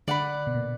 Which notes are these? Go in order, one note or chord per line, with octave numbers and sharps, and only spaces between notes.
D3 D5 F#5 B5
B2
A#2